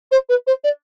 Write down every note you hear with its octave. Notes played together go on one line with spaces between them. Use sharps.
C5
B4
C5
D5